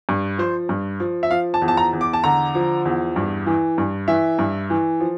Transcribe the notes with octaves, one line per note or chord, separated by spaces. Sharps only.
G2
F3 C5
G2
F3
E5
F3 F5
A5
E2
A5
A#5
E2
D6
A5
D3 A#5
F3
E2
G2
E3
G2
E3 E5
G2
E3
F3